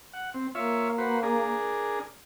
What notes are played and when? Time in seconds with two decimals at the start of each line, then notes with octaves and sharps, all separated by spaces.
0.13 F#5
0.34 C4
0.55 A#3 F4 C#5 E5
0.98 F#4 B4 C5
1.23 D4 G#4 A#4